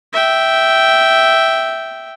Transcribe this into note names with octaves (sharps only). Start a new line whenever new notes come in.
E5 G5